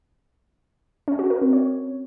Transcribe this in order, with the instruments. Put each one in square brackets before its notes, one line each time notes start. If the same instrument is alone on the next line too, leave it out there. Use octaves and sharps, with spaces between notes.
[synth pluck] C#4
F#4
A#4
C4
C#5